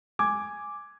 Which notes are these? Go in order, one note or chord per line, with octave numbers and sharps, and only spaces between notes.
G#5 D6 G#6